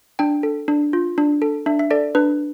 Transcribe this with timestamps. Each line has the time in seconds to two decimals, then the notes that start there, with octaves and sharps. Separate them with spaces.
0.19 D4 G5
0.43 A4
0.68 D4
0.93 F4
1.18 D4
1.42 A4
1.66 D4 E5
1.79 E5
1.91 A4 D5
2.15 D4 B4